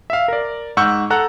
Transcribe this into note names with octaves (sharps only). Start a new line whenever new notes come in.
E5 F5
A#4 D5
G#2 F#5 C#6 E6 F6 G6
A4 F#5 A#5 F#6